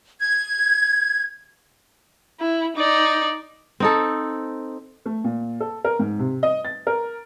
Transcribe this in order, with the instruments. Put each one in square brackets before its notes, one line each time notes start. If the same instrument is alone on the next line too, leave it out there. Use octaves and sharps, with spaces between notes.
[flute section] G#6
[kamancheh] E4
D#4 D5
[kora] C4 D#4 A4
[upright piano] A3
A#2
A4
A#4
G#2
C3
D#5
A6
A#4